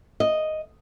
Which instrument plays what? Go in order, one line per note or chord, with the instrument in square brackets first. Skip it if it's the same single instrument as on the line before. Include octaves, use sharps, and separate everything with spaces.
[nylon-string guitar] D#5